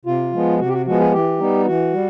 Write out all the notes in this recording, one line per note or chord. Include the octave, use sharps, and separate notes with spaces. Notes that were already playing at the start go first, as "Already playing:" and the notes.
C3 F4
F3 G#3 B3
C3 F#4
G4
F#4
F3 G#3 B3 F#4
G#4
E3 G4
G3 B3 D#4
E3 F#4
G3